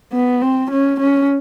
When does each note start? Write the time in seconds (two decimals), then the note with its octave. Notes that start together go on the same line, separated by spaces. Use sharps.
0.13 B3
0.42 C4
0.71 C#4
1.00 C#4